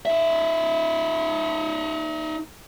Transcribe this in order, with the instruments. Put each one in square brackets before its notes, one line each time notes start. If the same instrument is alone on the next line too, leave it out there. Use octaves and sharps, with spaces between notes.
[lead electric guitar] D#4 E5